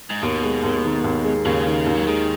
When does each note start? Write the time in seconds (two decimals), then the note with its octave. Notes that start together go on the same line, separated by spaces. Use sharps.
0.10 G#2
0.22 D#2 B2
0.43 G#3
0.63 D#2
0.84 D#3
1.04 D#2
1.24 G#3
1.45 D#2 C#3
1.67 D#3
1.86 D#2
1.95 F#3
2.07 D#3 G#3